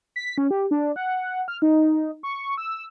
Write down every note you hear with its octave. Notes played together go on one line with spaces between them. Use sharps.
B6
C#4
G4
D4
F#5
F6
D#4
C#6
E6